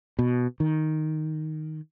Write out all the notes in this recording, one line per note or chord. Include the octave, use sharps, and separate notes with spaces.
B2
D#3